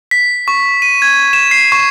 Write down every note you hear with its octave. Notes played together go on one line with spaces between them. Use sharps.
B6
C#6
D#7
G#6
E7
C7
C#6